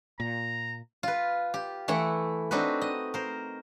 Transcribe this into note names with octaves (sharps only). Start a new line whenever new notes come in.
A#2 A#5
F4 B4
G4
E3 A3 E4 F#5
C4 D4 D#4 F#4 B4
D#5
A#4 C5